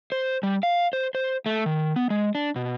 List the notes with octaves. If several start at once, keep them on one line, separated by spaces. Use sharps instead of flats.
C5
G3
F5
C5
C5
A3
D#3
B3
G#3
D4
B2